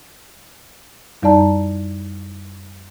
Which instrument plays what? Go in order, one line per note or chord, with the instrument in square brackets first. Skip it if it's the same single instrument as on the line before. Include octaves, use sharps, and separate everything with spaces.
[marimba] F#2 G3 D#4 D5 A5 A#5